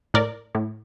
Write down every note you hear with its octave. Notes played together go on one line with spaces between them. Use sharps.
A2 A#4 D5
A2